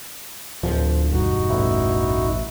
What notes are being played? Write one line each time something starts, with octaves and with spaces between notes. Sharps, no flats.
D1 F3
E1 G2 D#4 F#4
A1 E4